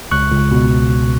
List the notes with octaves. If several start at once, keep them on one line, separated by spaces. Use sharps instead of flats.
C#2 C#6 F#6
C#2
B2